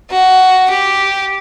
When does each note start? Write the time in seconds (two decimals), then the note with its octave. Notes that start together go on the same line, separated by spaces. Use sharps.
0.10 F#4
0.70 G4